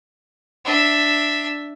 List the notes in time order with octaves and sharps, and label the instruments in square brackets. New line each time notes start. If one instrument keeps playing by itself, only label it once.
[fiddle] D4 E5